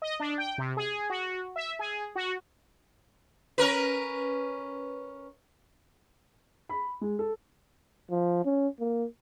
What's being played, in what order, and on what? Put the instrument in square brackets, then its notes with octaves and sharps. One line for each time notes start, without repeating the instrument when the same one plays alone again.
[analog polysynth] D#5
D4
G5
C3
G#4
F#4
E5
G#4
F#4
[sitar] C#4 A#4 B4
[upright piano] B5
G#3
A4
[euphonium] F3
C#4
A#3